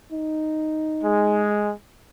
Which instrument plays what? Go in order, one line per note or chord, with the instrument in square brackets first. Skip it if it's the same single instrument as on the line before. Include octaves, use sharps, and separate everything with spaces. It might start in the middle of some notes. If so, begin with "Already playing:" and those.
[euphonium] D#4
[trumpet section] G#3